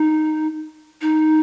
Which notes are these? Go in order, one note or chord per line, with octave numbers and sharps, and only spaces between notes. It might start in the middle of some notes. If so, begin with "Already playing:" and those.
Already playing: D#4
D#4